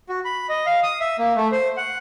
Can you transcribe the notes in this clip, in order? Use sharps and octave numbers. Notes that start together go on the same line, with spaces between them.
F#4
B5
D#5
F5
D#6
E5
A#3
A3
C5
F#5